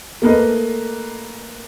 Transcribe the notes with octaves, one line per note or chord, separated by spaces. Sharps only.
A3 A#3 B4 D#5